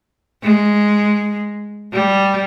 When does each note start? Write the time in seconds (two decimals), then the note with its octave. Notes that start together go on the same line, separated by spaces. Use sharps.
0.43 G#3
1.93 G3